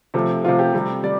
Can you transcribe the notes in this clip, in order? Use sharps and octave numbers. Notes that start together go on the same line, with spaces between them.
C3 F3 A3
C3 F3 A3 F4
G4
C3 G3
G3 D5